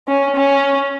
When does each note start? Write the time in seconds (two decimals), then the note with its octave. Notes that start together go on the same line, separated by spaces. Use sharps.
0.08 C#4
0.36 C#4